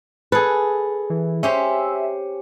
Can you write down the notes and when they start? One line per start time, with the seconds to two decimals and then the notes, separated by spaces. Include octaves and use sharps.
0.32 G#4 A4 B4
1.10 E3
1.43 C#4 G4 C5 E5